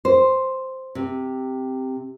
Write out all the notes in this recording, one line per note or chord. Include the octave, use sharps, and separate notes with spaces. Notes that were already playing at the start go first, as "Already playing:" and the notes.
C5
C3